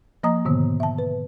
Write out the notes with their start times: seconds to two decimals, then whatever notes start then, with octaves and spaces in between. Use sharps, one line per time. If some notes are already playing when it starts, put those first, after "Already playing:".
0.23 F3 A#3 D#5 A#5 D#6
0.45 G#2 B2 D3 D#3 B3
0.80 E5 A5
0.98 B4